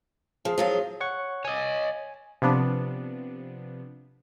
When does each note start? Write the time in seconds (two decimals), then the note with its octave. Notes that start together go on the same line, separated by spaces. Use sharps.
0.45 F3 G#4
0.58 F3 F#3 F4
1.01 C#5 F#5 C#6
1.45 C#5 D#5 G#5
2.42 C3 F3 B3 D4